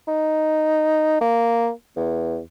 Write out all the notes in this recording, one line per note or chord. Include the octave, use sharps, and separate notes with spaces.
D#4
A#3
E2